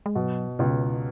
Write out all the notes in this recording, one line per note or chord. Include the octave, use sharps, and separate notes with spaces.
G#3
B2 F#3
C#2 B2